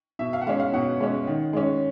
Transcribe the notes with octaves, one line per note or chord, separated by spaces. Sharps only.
B2 E5
F5
F#5
G#3 C#4 F5
F5
B2 F#5
G#3 C#4
D#3
G#3 C#4